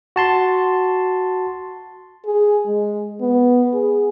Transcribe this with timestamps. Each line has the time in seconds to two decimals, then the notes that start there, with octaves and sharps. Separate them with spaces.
0.16 F#4 A5 C6
2.25 G#4
2.67 G#3
3.21 B3
3.74 G#4